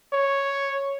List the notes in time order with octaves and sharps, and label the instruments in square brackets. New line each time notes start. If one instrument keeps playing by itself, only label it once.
[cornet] C#5